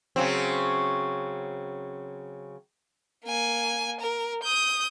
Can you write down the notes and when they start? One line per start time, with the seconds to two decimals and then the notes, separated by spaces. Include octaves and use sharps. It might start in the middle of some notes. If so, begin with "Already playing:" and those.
0.16 C#3 F#3 C4
3.25 A#3 G#5
4.00 A#4
4.43 D#6 G6